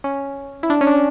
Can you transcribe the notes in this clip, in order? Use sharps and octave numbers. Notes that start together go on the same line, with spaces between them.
C#4
E4
D4
C#4
D4